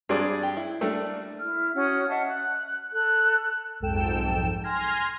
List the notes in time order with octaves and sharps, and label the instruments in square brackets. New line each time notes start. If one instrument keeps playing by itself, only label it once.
[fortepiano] G2 G#4 D5 [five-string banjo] C4
[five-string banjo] G4
E4
[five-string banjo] G3 A#3 D4 [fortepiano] A3
[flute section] E4 F6
C#4 F#4 D#6 F6
D#5 E5 F#5 A5
F#6
A4 F#6
[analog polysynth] B1 F2 G#2 A4 G5 E7
G#5 C6 F6 G#6 A#6